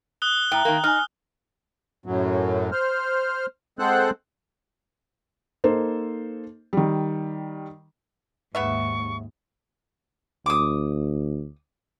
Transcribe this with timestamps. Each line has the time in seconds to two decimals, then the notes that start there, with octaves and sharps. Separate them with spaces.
0.22 D#6 F#6 G7
0.52 A2 G5 A#5
0.65 D#3 A#3
0.84 D#4 G#5 F6
2.06 F#2 A2 F#3
2.72 C5 F6
3.79 G#3 C4 A4 C5 F#5 F#6
5.64 A#3 D#4 A4 C5
6.73 D#3 G3
8.55 D#2 G#2 C#3 B3 E5 C#6
10.46 D2 D6 D#6